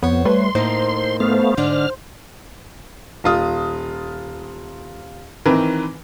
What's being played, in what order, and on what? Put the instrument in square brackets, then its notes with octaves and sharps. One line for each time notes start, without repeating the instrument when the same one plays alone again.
[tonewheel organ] F2 [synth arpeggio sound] B3 [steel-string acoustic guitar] C5 C#5
[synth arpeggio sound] G3 A3 B4 [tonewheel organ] C6
[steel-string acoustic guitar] A2 A#3 D#4 [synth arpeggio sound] C5
[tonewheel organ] A3 B3 F5
[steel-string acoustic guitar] G#2 D3 D4 [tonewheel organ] F6
[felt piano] D#1 F4 D#6
D#3 E3 C4 A#4 B4